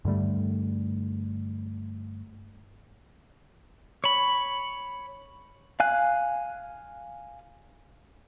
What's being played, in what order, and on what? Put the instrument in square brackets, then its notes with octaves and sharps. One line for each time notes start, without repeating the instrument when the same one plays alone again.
[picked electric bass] G2 D3 G3 A3
[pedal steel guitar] C#5 B5
F5 G#5 F#6